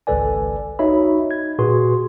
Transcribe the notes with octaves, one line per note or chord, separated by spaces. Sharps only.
G#1 C#2 A4 B4 D5 G#5
D#4 F#4 C#5 D#5 E5 B5
G#6
A#2 F#4 G#4 B4 C6